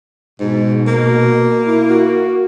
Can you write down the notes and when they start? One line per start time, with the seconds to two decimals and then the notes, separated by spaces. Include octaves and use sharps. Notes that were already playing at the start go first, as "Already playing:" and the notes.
0.40 G#2 B2
0.87 A#3
1.67 E4
1.90 F#4